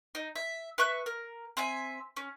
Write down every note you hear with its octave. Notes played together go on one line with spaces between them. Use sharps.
D#4
E5
B4 E5 C#6 F#6
A#4
C4 E5 G#5
C#4